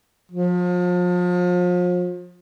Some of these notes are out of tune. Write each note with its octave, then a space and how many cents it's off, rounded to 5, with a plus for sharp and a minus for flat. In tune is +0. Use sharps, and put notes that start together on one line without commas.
F3 +35